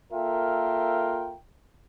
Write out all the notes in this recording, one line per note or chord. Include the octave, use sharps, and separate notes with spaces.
A#3 F4 A4 A#4 E5 G5